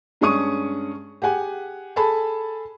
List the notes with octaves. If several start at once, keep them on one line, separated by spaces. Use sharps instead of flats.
G2 G#3 C#4 C#6 D#6 D#7
G4 G#4 F#5 G#5
G#4 A4 G#5 A5 B5